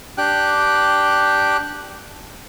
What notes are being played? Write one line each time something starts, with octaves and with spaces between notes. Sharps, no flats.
D4 G4 G5 F#6